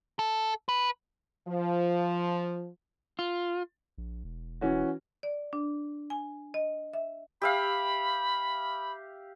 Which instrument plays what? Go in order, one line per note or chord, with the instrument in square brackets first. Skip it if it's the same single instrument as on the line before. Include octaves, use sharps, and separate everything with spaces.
[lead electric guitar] A4
B4
[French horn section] F3
[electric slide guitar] F4
[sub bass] A#1
E1
[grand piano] E3 C#4 F#4
[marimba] D5
D4
G#5
D#5
E5
[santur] G4 E5 F5 [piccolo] B5